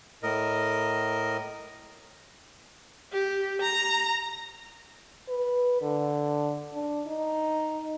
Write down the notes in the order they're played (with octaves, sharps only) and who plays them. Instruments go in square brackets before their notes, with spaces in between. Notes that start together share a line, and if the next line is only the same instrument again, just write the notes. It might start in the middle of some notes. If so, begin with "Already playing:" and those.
[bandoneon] A2 A#4 D#5
[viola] G4
A#5
[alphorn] B4
D3
D4
D#4